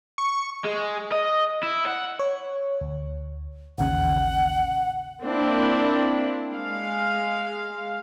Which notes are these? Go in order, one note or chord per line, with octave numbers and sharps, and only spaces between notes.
C#6
G#3
D#5
E4
F#5
C#5
D2
A1 D#2 C#3 F#5
A#3 C4 D4 E4
G#3 F5